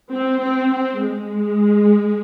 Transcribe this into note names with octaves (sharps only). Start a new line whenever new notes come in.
C4
C4
C4
G#3